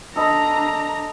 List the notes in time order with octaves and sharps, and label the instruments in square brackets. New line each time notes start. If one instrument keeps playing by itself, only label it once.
[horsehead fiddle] D4 A#5 [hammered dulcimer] A4 D#5 B5